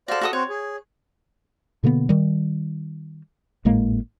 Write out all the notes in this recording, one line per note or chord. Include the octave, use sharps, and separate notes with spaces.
F#4 A4 C5 D5 F5
F#4 A4 D#6
C4 F#4 C5 C#5
G#4
B2 D3 A#3 B3
D#3 G3
G#1 A2 G#3 A#3